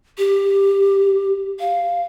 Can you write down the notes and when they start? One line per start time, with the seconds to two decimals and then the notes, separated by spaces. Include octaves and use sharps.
0.18 G4
1.60 F5